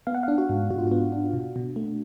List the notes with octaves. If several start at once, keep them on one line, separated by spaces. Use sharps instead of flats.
B3 F5
F#5
D4 F5
F#4
G#2
G#2 F#4
F4
B3 F#4
D4
B2
B2
A3